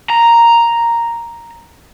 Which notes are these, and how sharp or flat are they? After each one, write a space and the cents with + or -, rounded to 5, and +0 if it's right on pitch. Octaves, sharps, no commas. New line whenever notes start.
A#5 +0